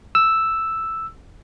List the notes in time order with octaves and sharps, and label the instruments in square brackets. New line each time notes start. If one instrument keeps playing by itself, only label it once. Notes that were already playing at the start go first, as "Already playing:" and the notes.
[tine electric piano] E6